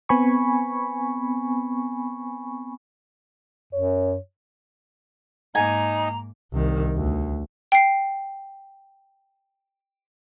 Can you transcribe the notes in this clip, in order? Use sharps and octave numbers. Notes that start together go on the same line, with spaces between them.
B3 C4 G#5 B5 C#6
F#2 C#5
G#2 A#3 D#4 D#5 G#5 A#5
C2 D#3
D2
G5 C7